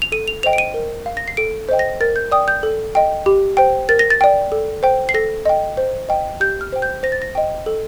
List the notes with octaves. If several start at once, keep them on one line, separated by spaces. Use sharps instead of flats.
F7
A4 D#7
F7
C5 D#5 G5 F7
D7
D#7
A#4
F5
A#6
C7
A4 D7
C5 D#5 G5
A#6
A#4 A6
G6
D5 G5 D#6
G6
A4
D#5 G5
G4
C5 G5
A#4 A6
A#6
A6
D5 G5
A4
C5 G5
C7
A4 A#6
D#5 G5
C5
D#5 G5
G4 G6
F6
C5 G5
G6
C5 A#6
A6
A#6
D#5 G5
A4